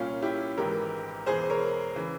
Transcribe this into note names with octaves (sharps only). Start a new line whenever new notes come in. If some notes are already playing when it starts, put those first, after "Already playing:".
Already playing: C2 A#2 C#4 F4
E4 G4
G#1 G#2 E3 G4 A#4
E1 E2 E3 G#4 C5
A#4 C#5
C#3 E3